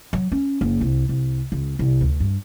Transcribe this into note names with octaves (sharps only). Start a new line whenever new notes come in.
F#3
C#4
F#1
C2
C2
C#2
C2
D2
G2